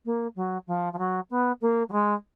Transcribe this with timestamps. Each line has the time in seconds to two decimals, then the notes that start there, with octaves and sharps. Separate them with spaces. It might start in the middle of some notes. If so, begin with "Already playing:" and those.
0.05 A#3
0.35 F#3
0.67 F3
0.93 F3
0.98 F#3
1.30 B3
1.61 A#3
1.88 F#3
1.92 G#3